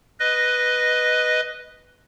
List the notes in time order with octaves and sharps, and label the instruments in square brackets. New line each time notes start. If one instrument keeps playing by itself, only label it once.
[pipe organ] B4 D#5